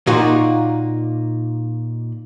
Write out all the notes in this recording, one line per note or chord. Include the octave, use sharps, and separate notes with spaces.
A#2 A#3 D#4 F4 F#4